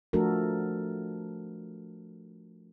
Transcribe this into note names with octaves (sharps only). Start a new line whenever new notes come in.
F3 A3 D4 F#4 A4 A#4